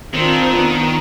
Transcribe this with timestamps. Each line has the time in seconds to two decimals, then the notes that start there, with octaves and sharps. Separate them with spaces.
0.13 D#3 C4 D4 F4
0.57 B3